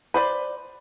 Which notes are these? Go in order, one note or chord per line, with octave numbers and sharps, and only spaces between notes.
B4 C5 D5